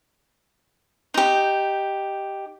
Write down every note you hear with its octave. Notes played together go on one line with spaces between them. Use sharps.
D#4 G4